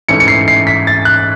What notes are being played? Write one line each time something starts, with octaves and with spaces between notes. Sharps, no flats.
G#2 E3 A3 C#4 C#7
C#7
C7
C7
B6
A6
F#6